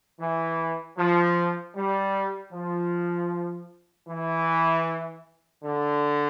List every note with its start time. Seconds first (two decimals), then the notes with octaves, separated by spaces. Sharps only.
0.20 E3
0.98 F3
1.76 G3
2.53 F3
4.08 E3
5.63 D3